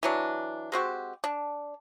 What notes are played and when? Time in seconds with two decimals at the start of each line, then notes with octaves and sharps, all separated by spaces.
0.03 E3 F#3 D4
0.72 G#3 C4 F#4 G4
1.24 D4